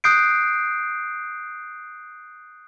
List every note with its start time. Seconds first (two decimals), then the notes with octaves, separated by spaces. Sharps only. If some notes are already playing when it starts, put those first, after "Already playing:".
0.04 D#6 F#6 G6 C7 D7